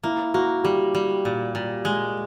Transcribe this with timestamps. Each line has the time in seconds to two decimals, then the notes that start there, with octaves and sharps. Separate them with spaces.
0.03 A#3 E4
0.34 A#3 F#4
0.64 G3 G4
0.95 G3
1.25 A#2
1.55 A#2
1.85 G#3